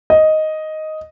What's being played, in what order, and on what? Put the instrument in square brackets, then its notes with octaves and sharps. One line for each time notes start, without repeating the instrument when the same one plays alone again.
[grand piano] D#5